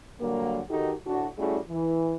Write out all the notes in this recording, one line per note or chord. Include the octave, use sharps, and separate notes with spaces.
D3 F#3 G3 A#3
D#3 D#4 F#4 G4 A4
D2 A2 D4 F#4
G3 A3 C#4 E4 F#4 G#4
E3